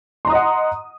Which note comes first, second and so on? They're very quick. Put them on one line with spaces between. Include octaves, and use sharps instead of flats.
C6 A#5 D#6 D#5 F#5